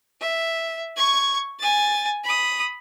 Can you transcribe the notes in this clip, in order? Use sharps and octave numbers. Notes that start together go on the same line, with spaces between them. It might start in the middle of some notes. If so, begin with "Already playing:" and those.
E5
C#6 G#6
G#5 A6
B5 D#6